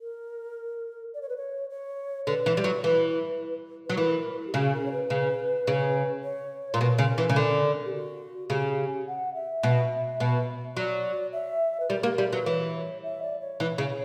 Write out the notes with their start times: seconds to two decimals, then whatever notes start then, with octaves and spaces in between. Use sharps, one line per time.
0.01 A#4
1.14 D5
1.22 C#5
1.29 B4
1.37 C#5
1.70 C#5
2.27 D3 B4
2.46 E3
2.57 G3
2.64 F#3
2.84 E3
3.86 F#3 B4
3.97 E3 A#4
4.32 B4
4.40 A#4
4.47 G4
4.54 C#3 F#4
4.73 A#4
4.86 C#5
4.92 B4
5.10 C#3
5.67 C#3
6.23 C#5
6.74 A#2
6.80 B2 A#4
6.99 C#3
7.18 E3
7.29 C#3
7.36 D3
7.85 G4
7.94 F#4
8.50 C#3 G4
9.07 F#5
9.34 E5
9.63 B2
10.20 B2
10.76 F#3 D5
11.33 E5
11.80 B4
11.90 G3 A#4
12.03 A#3 G4
12.18 G3 A#4
12.32 F#3 B4
12.46 E3 C#5
13.03 E5
13.23 D5
13.40 C#5
13.60 E3
13.78 C#3